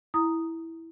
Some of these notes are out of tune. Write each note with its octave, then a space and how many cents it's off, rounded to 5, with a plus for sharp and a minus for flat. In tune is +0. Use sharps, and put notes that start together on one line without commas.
E4 -5 A#5 +0 D#6 +0